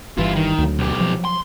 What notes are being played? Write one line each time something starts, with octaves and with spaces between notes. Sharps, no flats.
G1 G2 E3 E4 F4
D#3
D2 F#3
B1 G4
F3 F#3
C6